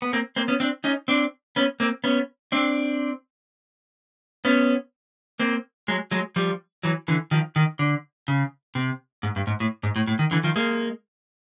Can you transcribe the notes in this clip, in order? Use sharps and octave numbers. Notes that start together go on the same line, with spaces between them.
B3
A#3 C4
A#3 C4
B3 C#4
C4 D4
C#4 D#4
C4 D4
B3 C#4
A#3 C4
B3 C#4
C4 D4
B3 C#4
A#3 C4
F#3 G#3
F#3 G#3
F3 G3
E3 F#3
D3 E3
D#3 F3
D#3
D3
C#3
C3
G#2
G2
G#2
A2
G#2
A2
A2
D#3
D3 E3
D#3 F3
G#3 A#3